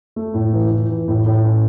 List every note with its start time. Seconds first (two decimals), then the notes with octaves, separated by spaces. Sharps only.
0.16 A3
0.34 A2
0.53 E3
0.71 E3
0.89 E3
1.08 A2
1.26 A2
1.44 C#4